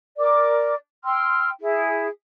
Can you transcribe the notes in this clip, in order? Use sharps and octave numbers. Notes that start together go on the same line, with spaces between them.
A#4 D5 D6
G5 C6 E6 F6
E4 G#4